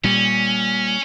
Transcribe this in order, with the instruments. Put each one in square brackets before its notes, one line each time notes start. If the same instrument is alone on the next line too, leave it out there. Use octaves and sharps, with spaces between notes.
[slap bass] A#2 G3 [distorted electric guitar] C#4